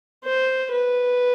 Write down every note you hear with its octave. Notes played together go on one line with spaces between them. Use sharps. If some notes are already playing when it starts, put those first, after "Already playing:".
C5
B4